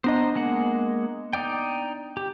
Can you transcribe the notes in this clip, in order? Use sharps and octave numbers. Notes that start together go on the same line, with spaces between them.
B3 D4 C5 D#5 A#5
G#3 A#3 F#5
D#4 D5 G5
G4